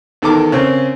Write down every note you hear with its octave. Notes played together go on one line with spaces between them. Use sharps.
E2 D#3 A4 A#4 D6
C#3 C4 A#4